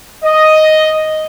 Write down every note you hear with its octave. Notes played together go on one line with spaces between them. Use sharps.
D#5